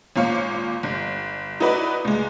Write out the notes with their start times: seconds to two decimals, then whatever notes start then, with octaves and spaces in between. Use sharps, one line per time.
0.16 G#1 A#2 C#5 F5 C#7
0.83 G1
1.60 D#4 E4 F#4 B4 D5 D#5
2.05 C#2 G#3